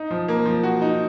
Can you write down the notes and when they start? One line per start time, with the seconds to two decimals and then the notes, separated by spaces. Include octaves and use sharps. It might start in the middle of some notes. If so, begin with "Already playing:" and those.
Already playing: D#4
0.11 F3
0.28 A#3
0.46 F3
0.63 F#4
0.82 D#4